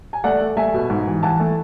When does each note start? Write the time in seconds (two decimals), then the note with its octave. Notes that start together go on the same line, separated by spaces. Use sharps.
0.13 G#5
0.24 A3 D5 F#5
0.40 A3
0.57 A3 E5 G#5
0.74 B2
0.90 G#2
1.07 E3
1.23 E3 F#5 A5
1.40 A3